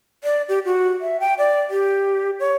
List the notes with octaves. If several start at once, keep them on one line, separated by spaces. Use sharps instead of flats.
D5
G4
F#4
E5
G5
D5
G4
C#5